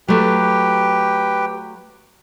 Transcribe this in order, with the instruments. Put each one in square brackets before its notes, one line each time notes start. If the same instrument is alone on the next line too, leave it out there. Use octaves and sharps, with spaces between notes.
[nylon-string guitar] F#3 A3 [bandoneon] G4 B4 G5